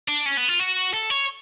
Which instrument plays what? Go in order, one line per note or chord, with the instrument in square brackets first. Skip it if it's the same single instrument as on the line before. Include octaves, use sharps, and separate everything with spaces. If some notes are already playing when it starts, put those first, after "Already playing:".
[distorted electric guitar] D4
C#4
B3
F4
F#4
A4
C#5